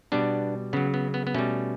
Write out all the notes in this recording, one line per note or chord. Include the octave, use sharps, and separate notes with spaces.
B2 G3 B3 D4
C#3 F#3 B3
B3
B3
B3
B2 G3 A3 C#4